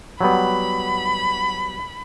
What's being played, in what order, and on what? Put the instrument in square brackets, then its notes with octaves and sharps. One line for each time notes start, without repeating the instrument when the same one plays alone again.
[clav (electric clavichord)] F#3 G3 B3 [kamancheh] B5